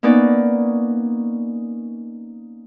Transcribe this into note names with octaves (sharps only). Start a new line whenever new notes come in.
A#3 B3 C#4 D#4 B4 D5